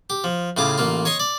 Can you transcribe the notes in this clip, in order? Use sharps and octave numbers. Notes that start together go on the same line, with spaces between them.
G4
F3
A2 C#3 F4 D6
A1 A#3 F4
C#5 D#5 C6 C#6 D#6
D5